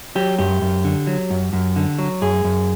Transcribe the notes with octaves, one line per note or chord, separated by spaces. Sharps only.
F#3 G4
F#2 G4
F#2
D3
F#3
F#2
F#2
D3
F#3
F#2 G#4
F#2